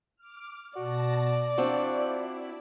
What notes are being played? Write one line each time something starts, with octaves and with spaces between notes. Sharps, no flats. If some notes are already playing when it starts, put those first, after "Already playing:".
D6 F6
B2 F#4 D5 A5 A#6
F3 C4 D4 E4 F#4